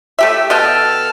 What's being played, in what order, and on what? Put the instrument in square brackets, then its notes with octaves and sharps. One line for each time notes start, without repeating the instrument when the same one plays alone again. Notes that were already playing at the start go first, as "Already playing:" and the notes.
[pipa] A3 G4 E5
[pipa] B2 D#5 G5 [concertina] A4 A5 F6